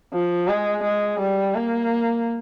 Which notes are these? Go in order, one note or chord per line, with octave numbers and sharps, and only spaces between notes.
F3
G#3
G#3
G3
A#3